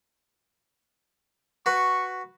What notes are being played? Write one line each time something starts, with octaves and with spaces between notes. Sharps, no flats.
F#4 B4 C#6